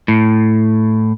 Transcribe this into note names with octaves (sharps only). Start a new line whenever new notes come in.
A2